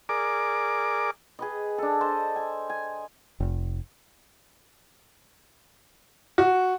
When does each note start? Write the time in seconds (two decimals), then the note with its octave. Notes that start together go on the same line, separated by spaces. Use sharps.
0.09 G#4 A#4 D5 D6
1.39 G#4 B4 D#5
1.78 D4 A4
2.01 C5 D#5 A5
2.36 G#5
2.70 G#5
3.40 F1
6.38 F#4